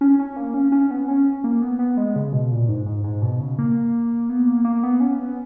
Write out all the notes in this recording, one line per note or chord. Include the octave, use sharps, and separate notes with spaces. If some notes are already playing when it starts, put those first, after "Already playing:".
C#4
C#4
A#3
C#4
C#4
B3
C#4
A#3
B3
B3
G#3
C#3
B2
A#2
G#2
G#2
G#2
B2
C#3
A#3
B3
A#3
A#3
B3
C#4
B3